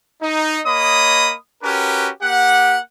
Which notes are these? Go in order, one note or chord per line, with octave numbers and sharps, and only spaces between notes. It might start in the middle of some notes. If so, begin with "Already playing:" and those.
D#4
A#3 C#5 D#5 B5 D#6
C#4 F#4 G4 A#4 B4
A#3 G4 F#5